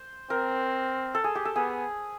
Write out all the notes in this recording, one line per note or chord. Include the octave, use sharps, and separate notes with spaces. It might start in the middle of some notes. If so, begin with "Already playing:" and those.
Already playing: C5
C4 A#4
A4
G#4
G4
A4
B3 G#4